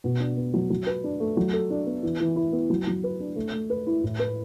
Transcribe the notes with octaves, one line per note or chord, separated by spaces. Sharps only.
B2
D4
B3
F#3
F#3
B4
D4
A3
F#3
A4
D4
B3
E3
E3
E4
B3
F#3
F#3
B4
D4
A3
A3
B4
E4
A2
B4